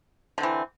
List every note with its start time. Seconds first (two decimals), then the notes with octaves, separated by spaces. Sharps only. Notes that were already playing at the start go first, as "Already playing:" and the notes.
0.38 D3
0.41 C4
0.43 E3